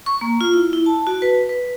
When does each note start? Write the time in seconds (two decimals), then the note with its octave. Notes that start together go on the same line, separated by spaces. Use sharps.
0.06 C#6
0.21 A#3
0.41 F4
0.54 E4
0.73 E4
0.86 A5
1.07 F#4
1.22 B4
1.49 B4